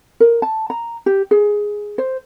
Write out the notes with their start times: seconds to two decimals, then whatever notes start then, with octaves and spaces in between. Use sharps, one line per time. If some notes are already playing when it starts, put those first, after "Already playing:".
0.20 A#4
0.42 A5
0.70 A#5
1.06 G4
1.31 G#4
1.98 C5